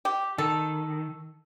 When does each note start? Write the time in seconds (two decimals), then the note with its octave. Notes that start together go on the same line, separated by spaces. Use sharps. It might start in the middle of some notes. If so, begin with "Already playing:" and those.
0.05 G4
0.38 D#3 A4